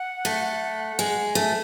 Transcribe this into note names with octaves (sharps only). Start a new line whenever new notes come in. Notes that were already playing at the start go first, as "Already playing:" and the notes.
Already playing: F#5
A3
G#3
A3 G#5